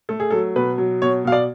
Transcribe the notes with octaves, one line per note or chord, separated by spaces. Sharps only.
A3 A4
G#4
F#3 A4
B2 B4
F#3
B2 C#5
B2 F5
D5